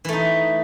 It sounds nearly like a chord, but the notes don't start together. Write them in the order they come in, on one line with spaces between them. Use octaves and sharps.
E3 A3 D#4